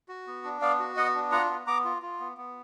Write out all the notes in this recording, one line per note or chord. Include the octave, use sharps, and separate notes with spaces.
F#4
B3
D4
B3 D5 F5
F#4
B3 D#5 F#5
D4
F4 F#5 A#5
B3
B3 A#5 D6
F4
F4
B3
B3